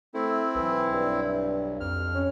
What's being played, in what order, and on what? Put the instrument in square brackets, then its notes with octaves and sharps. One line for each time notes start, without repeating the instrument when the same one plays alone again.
[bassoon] A3 [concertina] C4 E4
[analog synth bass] B1 [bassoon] E3
[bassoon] G2
[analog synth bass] F2 [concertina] F6
[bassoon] C#4